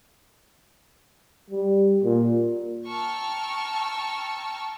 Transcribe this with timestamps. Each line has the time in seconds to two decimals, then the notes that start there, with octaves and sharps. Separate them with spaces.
1.50 G3
2.04 A#2
2.88 G5 A5 A#5 C#6 E6 F6